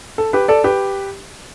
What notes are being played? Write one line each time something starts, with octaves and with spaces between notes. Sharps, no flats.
A4
G4 B4
A4 D5
G4 B4